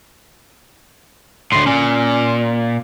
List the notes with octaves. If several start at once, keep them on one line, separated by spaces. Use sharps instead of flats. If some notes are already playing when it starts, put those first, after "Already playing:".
D2 A2 C6
A#2 C#4